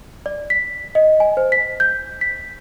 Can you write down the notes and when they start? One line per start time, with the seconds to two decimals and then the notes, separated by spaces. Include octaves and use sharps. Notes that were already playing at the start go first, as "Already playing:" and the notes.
0.26 D5
0.50 B6
0.95 D#5
1.20 G#5
1.37 C5
1.52 B6
1.80 G6
2.21 B6